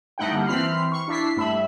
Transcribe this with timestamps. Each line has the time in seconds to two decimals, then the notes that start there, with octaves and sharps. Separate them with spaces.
0.18 G2 A3 D#4 E4 F#5 G5
0.31 D3 G3 A#3
0.47 E3 C4 B5 F6 C7
0.92 C#6
1.08 D4 E4 B6 C7
1.37 G2 A3 E5 B5